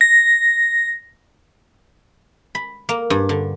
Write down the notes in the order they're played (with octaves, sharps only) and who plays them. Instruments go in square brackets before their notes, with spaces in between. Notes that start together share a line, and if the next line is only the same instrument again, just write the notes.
[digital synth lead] A#6
[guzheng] B5
A#3
G2
D3